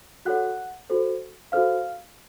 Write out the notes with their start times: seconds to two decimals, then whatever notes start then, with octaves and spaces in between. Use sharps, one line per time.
0.25 F#4 A4 C#5 F#5 F#6
0.90 F#4 A4 C5
1.52 F#4 A4 C5 F5 F6